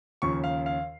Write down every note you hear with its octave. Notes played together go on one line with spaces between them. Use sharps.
D#2 C#3 F3 C#6
F5
F5